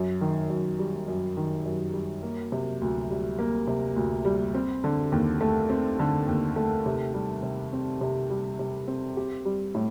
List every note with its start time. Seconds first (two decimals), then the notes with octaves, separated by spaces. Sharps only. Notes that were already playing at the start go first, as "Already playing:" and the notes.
Already playing: F#2
0.21 D#3
0.50 F#2
0.79 G3
1.08 F#2
1.37 D#3
1.65 F#2
1.94 G3
2.23 A#3
2.52 C3
2.81 D2
3.10 G3
3.39 A#3
3.67 C3
3.96 D2
4.25 G3
4.55 C4
4.84 D3
5.12 D#2
5.41 A3
5.70 C4
5.99 D3
6.28 D#2
6.56 A3
6.86 C3
7.14 G3
7.43 C3
7.73 C4
8.01 C3
8.30 G3
8.59 C3
8.88 C4
9.17 G4
9.45 G3
9.75 A2